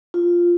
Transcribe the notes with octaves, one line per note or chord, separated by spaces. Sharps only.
F4